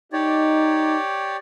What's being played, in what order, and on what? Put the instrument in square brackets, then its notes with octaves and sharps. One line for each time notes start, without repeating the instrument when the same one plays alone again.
[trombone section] D#4 [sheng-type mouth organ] G4 C#5 D5